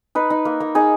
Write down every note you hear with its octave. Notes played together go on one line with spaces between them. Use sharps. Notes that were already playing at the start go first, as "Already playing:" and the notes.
D#4 B4
D#4
A#3
A#3
D#4 G#4